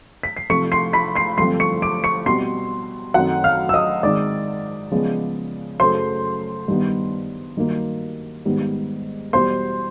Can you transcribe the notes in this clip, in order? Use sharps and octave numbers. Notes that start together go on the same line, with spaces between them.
B6
C7
C3 F3 A3 C#6 C#7
C6 C7
B5 B6
C6 C7
G2 D3 F3 A3 C4 C6 C7
C#6 C#7
D6 D7
C#6 C#7
B2 G3 C4 C6 C7
F#2 D#3 F#3 A3 C4 F#5 F#6
F5 F6
E6
D#5 D#6
G#2 D#3 G#3 C4 D5 D6
C#3 F3 G#3 B3
F#2 C#3 F#3 A3 C5 C6
G2 D#3 G3 B3
G2 D#3 F#3 A#3
G#2 D#3 G3 B3
E2 B2 G3 C5 C6